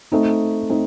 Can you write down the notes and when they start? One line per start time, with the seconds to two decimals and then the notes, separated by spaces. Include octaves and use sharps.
0.12 A3 C4 D#4
0.70 A3 C4 D#4